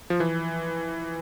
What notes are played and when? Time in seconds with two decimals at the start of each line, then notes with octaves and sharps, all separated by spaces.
0.10 F3
0.20 E3